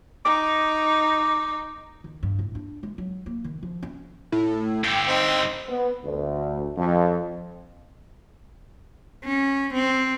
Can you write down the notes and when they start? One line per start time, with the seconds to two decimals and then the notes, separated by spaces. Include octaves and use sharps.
0.25 D#4 D6
2.04 D#3
2.23 G2
2.39 A2
2.55 D4
2.83 G#3
2.98 F#3
3.26 A#3
3.44 D#3
3.63 F3
3.83 C#4
4.32 A2
4.84 G2 D3 G5
5.08 C4 D#4
5.69 B3
6.03 D2
6.78 F2
9.24 C#4
9.73 C4